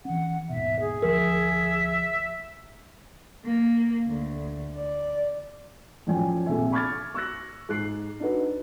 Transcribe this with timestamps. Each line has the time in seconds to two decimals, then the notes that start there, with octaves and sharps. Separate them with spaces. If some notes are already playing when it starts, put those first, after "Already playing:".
0.05 E3 C#4 F#5
0.49 D#2 G#2 B2 E5
0.80 G#4
1.02 D2 F3 A3 A#4 E5
3.44 A#3
4.07 D2
4.75 D5
6.07 F#2 A2 F3 D5 G5 G#5
6.46 A#1 C3 A3 E5 G#5
6.72 B5 C#6 D6 F6 G#6 A6
7.14 C#6 E6 F#6 A#6
7.69 G#2 F#6 C7
8.20 D4 D#4 F#4 B4